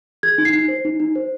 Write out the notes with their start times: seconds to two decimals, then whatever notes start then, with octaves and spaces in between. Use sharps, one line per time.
0.23 G#4 G#6
0.38 D#4
0.45 C7
0.53 D#4
0.68 C5
0.85 D#4
1.00 D#4
1.15 C5